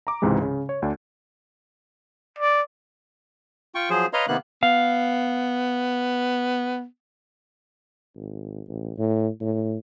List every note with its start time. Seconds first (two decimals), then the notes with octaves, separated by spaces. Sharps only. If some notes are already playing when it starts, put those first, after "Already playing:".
0.07 A#5 D6
0.22 C#2 G#2 C3 E3 G#3
0.42 C#3
0.69 C#5
0.82 D2 D4
2.38 D5
3.75 F4 G5 C#6
3.90 F3 F#3 G#4 C5
4.13 B4 C#5 D#5 F5 A#5 C6
4.28 C3 D#3 A#3 B3 F#6
4.63 B3 F5
8.16 G#1
8.68 A1
8.98 A2
9.40 A2